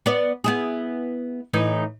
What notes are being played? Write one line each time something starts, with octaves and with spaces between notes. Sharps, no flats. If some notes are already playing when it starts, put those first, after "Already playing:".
B3 D5
B3 E4 G#4
A2 E3 D#4